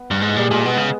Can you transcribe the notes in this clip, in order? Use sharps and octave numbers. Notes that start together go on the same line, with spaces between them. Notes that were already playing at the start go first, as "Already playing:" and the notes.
Already playing: B3
G2
G#2 G#3
A#2 G3
A#2 G#3
B2 G#3 B3
C#3